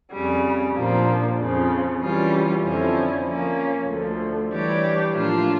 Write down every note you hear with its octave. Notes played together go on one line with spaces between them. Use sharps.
F2 C#3 G3
A#2 F3 A#3 D4
F2 C#3 F3
C#3 E3 G3 C#4 F4
F2 D3 F3 C#4 E4
F3 A#3 C#4
D2 D3 F3
E3 G3 D4 G4 C#5
A2 F3 A#3 D4 F4